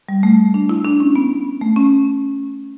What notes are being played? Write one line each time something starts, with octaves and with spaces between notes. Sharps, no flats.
G3
A3
D4
E4
D4
C#4
B3
A3
C#4